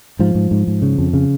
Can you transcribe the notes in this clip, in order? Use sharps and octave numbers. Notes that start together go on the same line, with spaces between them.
G#2 F3
G#2
G#2
G#2
C#3
F2
C#3